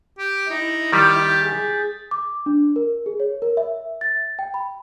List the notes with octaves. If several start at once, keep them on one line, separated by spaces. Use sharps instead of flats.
G4
D#4 E4
D#3 G3 G4 G6 A6 B6
G#4
D6
D4
A#4
G#4
C#5
A#4
E5
A6
G5
B5